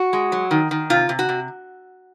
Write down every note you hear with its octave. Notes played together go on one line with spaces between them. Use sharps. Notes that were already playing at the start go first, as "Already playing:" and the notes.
Already playing: F#4
G#3
F#3
D#3
D#3
C3 F4
C3
F#4
C3